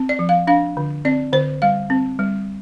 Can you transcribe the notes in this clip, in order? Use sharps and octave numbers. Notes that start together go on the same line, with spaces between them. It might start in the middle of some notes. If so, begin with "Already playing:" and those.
Already playing: C4
D5
F3
F5
D4 F5
D3
C4 D5
D3 C5
G3 F5
C4
G3